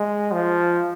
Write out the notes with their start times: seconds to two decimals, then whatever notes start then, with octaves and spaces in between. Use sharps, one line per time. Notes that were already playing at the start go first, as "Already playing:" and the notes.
Already playing: G#3
0.33 F3